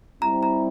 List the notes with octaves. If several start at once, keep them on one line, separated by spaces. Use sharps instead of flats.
G3 C4 E4 A#5
A#5